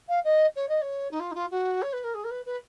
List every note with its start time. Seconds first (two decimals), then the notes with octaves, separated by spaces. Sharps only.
0.08 F5
0.24 D#5
0.56 C#5
0.68 D#5
0.81 C#5
1.11 D#4
1.20 F4
1.31 D#4
1.35 F4
1.51 F#4
1.82 C#5
1.93 B4
2.04 A#4
2.14 G#4
2.24 A#4
2.30 B4
2.45 B4